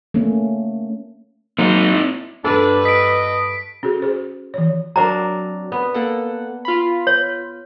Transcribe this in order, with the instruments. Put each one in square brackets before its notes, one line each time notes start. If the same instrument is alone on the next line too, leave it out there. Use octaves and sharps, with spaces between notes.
[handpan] A3 A#3 C#4
[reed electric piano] F#3 A#3 [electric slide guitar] C4 D#4
[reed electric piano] E4
[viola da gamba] G2 B4 [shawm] D4 [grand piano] A4
[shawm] D#5 [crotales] B6 D7
[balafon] C#4 F#4 G#4 A4
G#4 C5
E3 C#5
[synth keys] F#3 [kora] C4 D4 A#4 [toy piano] A#5
[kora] B3
[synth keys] A#3 A4 F#5
F4 B5
[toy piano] C#5